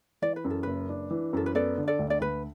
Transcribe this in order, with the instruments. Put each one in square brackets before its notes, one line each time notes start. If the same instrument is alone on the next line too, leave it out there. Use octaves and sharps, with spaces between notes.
[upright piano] E3 [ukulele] D5
[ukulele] B4
[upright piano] F#2
[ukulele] A4
[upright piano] F#1 [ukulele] B4
[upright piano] D4
E3
[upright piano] F#2 [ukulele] A4
[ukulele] B4
[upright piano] B3 [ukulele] A4 D5
[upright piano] D3
[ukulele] A4 D5
[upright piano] D2
[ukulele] D5
[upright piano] D2 [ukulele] B4